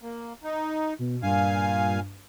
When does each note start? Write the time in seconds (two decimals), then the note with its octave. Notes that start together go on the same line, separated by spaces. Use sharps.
0.03 A#3
0.44 D#4
0.99 B2
1.23 G2 A#2 F5 G#5